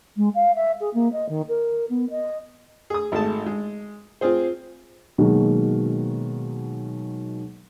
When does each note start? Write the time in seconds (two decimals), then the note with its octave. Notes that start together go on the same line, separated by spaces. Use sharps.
0.17 G#3
0.35 F5
0.55 E5
0.80 G#4
0.94 A#3
1.12 D#5
1.29 D#3
1.48 A#4
1.90 B3
2.10 D#5
2.90 G#4 D#6
3.12 G#1 A3 G#4 A5
3.46 G#3
4.21 C4 F4 G#4 C5
5.18 B2 D#3 F#3 G#3 A#3